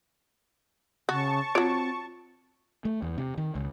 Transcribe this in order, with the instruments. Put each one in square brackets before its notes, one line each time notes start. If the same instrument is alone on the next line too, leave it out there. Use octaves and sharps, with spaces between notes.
[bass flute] C#3 [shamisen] F#4 [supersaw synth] A5 C#6
[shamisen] F#3 C#5 [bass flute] C4 [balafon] F4
[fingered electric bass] A3
E2
C3
D#3
C#2